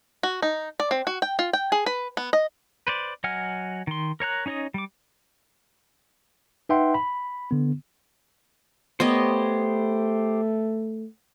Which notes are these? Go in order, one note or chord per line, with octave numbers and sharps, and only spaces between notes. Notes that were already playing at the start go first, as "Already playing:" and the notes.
F#4
D#4
D5
C4
F#4
G5
F4
G5
G#4
B4
B3
D#5
B4 C5 D5
F#3 D#5 F#5 G#5 F6
D#3 C6
A#4 C#5 A#5 F#6
C#4 D#4 C#5 D#5 D#6
G3 D6
D#4 B4 E5 F#5 G5 C6
B5
D3 B3
A3 B3 G4 C5 C#5 D#5